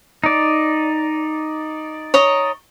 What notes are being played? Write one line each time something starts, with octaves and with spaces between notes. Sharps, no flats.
D#4 D5
C#5 D#5 A#5